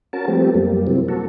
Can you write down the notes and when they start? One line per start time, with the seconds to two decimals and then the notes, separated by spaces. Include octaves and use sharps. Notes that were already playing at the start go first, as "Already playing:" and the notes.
0.13 C#4 F#4 A#4 A5
0.28 F3 G3 A3 B3 C4 G4
0.54 F#2 G3 A#3
0.87 C3 E3 F#3 G3 C4
1.08 A#3 F#4 A4